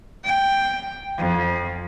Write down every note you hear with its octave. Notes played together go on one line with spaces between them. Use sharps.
G5
F2